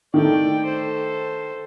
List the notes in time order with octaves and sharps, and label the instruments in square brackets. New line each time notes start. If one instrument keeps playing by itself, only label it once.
[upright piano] D#3 A3 [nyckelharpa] D5 G5
[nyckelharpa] A4 C5